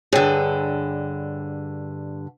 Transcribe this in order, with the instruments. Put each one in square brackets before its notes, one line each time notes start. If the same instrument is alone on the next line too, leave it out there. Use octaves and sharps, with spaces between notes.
[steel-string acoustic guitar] G2 D3 [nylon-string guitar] G#4 [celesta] C#5 G5 E6